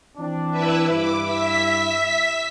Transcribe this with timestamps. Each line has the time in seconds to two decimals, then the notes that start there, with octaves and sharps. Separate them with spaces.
0.18 E3 C4 D4
0.51 E4 B4 E5
0.90 G2 E4 D6
1.23 E5 B6